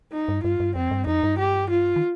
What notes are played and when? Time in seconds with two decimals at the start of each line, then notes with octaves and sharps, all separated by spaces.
0.12 D#4
0.28 G2
0.44 G2 F4
0.60 G2
0.75 F2 C4
0.91 G2
1.07 F2 D#4
1.23 G2
1.39 G4
1.70 F4
1.96 D#3